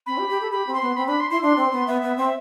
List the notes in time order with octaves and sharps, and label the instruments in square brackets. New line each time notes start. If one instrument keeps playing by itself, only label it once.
[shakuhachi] C4 [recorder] B5
[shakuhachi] G4
G4
A4
[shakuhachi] G4 [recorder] B5
[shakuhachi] C4
[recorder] C6
[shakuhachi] B3
[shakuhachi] C4 [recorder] B5
[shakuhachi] D4 [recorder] B5
[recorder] C6
[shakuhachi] E4 [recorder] C6
[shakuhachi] D4 [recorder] C6
[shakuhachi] C4
B3
[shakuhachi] B3 [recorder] E5
[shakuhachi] B3
C4